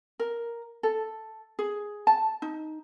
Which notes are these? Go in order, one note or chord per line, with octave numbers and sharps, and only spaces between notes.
A#4
A4
G#4
A5
D#4